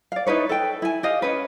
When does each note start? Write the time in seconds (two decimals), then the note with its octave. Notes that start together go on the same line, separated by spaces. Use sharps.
0.12 D5 F5
0.27 D#4 E4 B4 C#5
0.49 A4 B4 G5
0.82 E4 G#5
1.03 G4 D#5 F5
1.22 C#4 B4